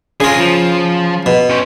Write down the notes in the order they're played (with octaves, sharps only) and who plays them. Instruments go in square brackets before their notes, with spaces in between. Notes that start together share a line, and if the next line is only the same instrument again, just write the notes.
[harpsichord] C#3 F4 [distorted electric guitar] G#4 A#4
[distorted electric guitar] F3
[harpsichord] B2
[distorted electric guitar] C#4 C5